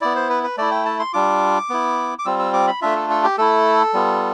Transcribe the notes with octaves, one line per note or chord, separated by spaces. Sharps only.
B3 E4 D5
C5
B4
B4
A3 E4 D5
G5
A5
C6
G3 D4 F4 D6
B3 E4
D6
G3 C4 F4 E6
E6
D6
B5
A3 D4 F4 E5
A4
A4
G4
A3 E4 A4
G3 B3 F4